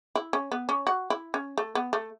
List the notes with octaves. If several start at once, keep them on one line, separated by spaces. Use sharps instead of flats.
E4
C#4
B3
C#4
F#4
E4
C#4
A3
B3
A3